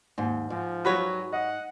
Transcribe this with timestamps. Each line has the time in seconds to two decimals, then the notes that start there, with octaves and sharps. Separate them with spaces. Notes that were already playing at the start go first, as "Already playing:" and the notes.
0.18 D#2 G#2
0.50 G#2 F3
0.85 F#3 G3 F#4 B4 C#5
1.33 D#5 F#5